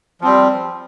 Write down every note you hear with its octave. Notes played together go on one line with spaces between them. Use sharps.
F3 G3 C4